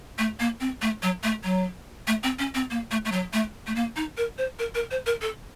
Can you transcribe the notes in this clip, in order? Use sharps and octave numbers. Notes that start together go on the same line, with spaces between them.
A3
A#3
C4
A3
F#3
A3
F#3
A3
C4
C#4
C4
A#3
A3
A3
F#3
A3
A3
A#3
D#4
A#4
C5
A#4
A#4
C5
A#4
A4